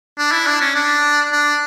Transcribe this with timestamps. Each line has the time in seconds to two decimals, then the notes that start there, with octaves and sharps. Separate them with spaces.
0.18 D4
0.32 E4
0.47 D4
0.61 C#4
0.75 D4
1.32 D4